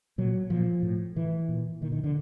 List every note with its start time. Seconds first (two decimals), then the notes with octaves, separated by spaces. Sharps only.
0.18 A#2 F#3
0.50 A#2 F3
0.83 A2
1.16 A2 E3
1.49 A#2
1.81 A#2 D#3
1.92 D#3
2.04 D3